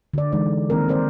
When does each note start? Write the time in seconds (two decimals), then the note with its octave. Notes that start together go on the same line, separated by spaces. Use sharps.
0.14 D3 D5
0.32 E3 G#3 D#4 D5
0.70 D#3 A#3 C4 A#4
0.89 C4 A#4 C5 D5